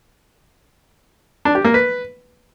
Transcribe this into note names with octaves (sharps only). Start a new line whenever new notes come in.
D4
G4
A#3
B4